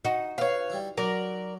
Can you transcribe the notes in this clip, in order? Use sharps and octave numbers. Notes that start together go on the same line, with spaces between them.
D#4 F#4 D#6
B4 C#5 F5
G3 E4
F#3 A#4 D5